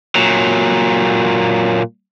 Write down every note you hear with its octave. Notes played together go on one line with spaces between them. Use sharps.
A#2 F#3